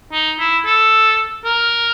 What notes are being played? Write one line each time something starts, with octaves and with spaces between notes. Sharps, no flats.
D#4
E4
A4
A#4